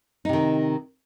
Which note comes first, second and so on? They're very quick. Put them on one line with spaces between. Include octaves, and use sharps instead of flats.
D#4 C3 D#3